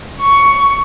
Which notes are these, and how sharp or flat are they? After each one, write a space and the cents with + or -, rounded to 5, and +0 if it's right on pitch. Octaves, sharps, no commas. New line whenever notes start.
C#6 +10